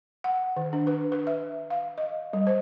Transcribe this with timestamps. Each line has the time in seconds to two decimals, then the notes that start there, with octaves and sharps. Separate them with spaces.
0.24 F#5
0.57 D#3
0.73 D4
0.87 B4
1.12 B4
1.27 E5
1.70 F5
1.98 D#5
2.33 G3
2.47 C5